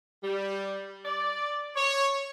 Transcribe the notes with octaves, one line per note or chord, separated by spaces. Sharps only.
G3
D5
C#5